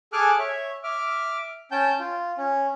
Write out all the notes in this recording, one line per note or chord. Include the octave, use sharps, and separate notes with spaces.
G#4 A4 G#5 D6 F6 F#6
C#5 E5
E5 D6 F6
C#4 G5 A5 G6
F4
C#4